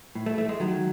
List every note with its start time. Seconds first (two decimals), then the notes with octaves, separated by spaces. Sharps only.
0.15 A2
0.26 A3
0.38 E3 A3
0.49 G#3
0.60 D#3 F#3